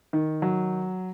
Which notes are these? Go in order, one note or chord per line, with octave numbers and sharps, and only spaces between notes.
D#3
F#3